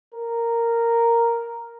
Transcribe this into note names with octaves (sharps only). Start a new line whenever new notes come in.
A#4